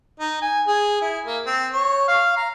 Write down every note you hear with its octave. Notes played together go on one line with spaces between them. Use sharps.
D#4
G#5
G#4
E4
A#3
C4
C#5
F5
A#5